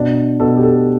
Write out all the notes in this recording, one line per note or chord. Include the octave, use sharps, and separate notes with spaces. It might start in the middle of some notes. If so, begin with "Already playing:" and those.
Already playing: B2 D4
B2 A4
G4
A4